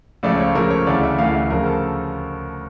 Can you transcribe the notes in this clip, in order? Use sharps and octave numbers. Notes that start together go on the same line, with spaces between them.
C#2 C#3 F3 A3 D5
C#5
C#2 C#3 F3 A3 A#4
C#5
D2 C#3 E3 A3 D5
E5
D2 C#3 E3 A3 F5
E5
D2 C#3 F3 A3 A#4
A4